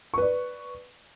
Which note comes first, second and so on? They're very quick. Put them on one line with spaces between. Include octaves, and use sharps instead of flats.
C#6 B4 D5